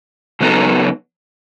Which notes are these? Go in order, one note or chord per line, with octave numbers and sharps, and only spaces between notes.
C#3 F#3 B3 D#4 A4